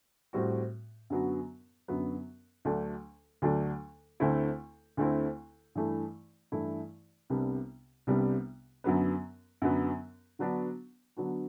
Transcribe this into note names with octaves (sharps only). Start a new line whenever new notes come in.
A2 G3 C4 F#4
F#2 D3 F#3 B3 F#4
F#2 D3 F#3 B3 F#4
D2 D3 F#3 A3 D4
D2 D3 F#3 A3 D4
D2 D3 A3 C4 E4
D2 D3 A3 C4 E4
G2 E3 A3 E4
G2 E3 A3 E4
C2 C3 G3 B3 D4
C2 C3 G3 B3 D4
F#2 D3 F#3 B3
F#2 D3 F#3 B3
D3 F#3 B3 D4 F#4
D3 F#3 B3 D4 F#4